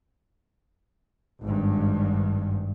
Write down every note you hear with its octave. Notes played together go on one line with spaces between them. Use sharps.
G#1 G2